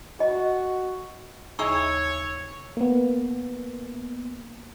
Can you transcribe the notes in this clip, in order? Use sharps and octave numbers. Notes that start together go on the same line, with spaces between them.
F#4 D#5
D#2 C#3 D#4 E4 G#4 C#5 C#6 E6
A#3 B3